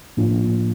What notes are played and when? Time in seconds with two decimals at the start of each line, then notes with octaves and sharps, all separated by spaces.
0.17 A2 F3 A#3 D4 F4